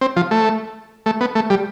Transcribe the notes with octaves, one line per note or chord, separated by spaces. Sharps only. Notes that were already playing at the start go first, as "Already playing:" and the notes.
C4
F3
A3
A3
B3
A3
G3